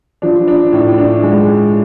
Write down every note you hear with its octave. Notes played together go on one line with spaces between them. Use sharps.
F3 D4
D4
A2
D4
G#3